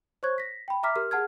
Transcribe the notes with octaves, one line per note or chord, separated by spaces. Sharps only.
C5 C#5 C#6 F#6 G#6
A#6 B6
G5 B5
E5 A#5 D6 F6 B6
G4 A#4 F6
G#4 F#5 A5 F6 G#6